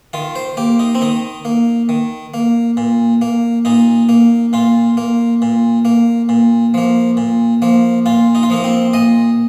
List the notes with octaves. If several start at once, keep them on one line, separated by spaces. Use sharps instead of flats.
D#3 F4
C5
A#3 G4
D#4
C4
D#3 D#4
A#3
D#3
A#3
A#2
A#3
A#2 D#4
A#3
A#2 F4
A#3
A#2
A#3
A#2
F3 A#3
A#2
F3 A#3
A#2 F4
D#4
F4
F3 A#3 D#4
C4
A#2 D#5